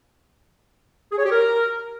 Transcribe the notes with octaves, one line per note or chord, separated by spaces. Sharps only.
G#4
C#5
G4
A#4